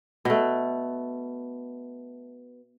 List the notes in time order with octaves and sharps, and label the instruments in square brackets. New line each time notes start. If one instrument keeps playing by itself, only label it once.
[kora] B2 A3